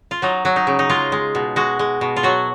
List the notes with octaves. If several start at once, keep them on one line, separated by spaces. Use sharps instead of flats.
F4
F#3 D#4
F#3
D#4
C#3
D#4
G#3 F4
G#3
B2
G#3 F#4
G#3
B2
F4
F#3 F#4